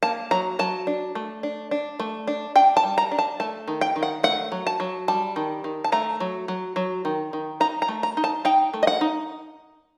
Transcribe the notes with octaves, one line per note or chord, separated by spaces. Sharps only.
A#3 A5
F#3 A#5
F#3 A5
D4
A3
D4
D4
A3
D4
D4 G5
A5
G3
A#5
D4
A5
A3 A5
D#3
G5
D#3
F#5
A3 F#5
F#3
A5
F#3
G3 A5
D#3
D#3
A5
A3 A#5
F#3
F#3
F#3
D#3
D#3
D#4 A#5
A#5
A3
A#5
D#4
A5
D#4 G5
A3
D#5
F#5
D#4